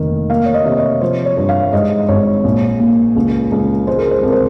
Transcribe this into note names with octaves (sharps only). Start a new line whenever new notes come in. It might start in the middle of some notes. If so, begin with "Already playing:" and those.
Already playing: F1 D#3 A#3
A#3 F5
C#5
D#5
C3
C#5
F3 C5
C#5
G2
F5
G#2 D#5
G#1 C#5
A#1
A#2
C#2
C#2
G#3 C5
A#4
C5
C2 A#4
C5